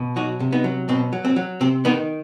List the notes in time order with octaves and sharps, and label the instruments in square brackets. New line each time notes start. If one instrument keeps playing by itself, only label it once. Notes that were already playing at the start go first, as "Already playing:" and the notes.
Already playing: [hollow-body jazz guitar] B2
F#3 D#4 F#4
C3
B3 D#4
F#3
B2 C4
F#3
C4
F#3
C3 C4
D#3 B3 D#4